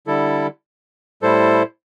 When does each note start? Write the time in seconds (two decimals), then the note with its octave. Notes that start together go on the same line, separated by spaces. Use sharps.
0.07 D3 G3 E4 A4
1.22 A2 G3 E4 A4 C5